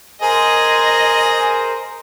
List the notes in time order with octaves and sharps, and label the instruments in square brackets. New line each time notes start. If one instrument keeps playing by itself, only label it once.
[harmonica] G#4 [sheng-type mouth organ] A#4 C5 [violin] D#5